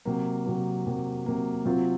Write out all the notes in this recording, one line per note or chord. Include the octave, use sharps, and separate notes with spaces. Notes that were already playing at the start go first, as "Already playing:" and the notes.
C3 F#3 A#3
C3 F#3 A#3
C3 F#3 A#3
C3 F#3 A#3
C3 F#3 C4 F4